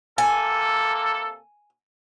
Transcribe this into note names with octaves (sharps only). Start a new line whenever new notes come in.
C3 A#3 A4 G#5